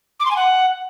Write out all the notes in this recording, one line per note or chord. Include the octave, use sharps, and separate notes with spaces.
D6
C6
G#5
F#5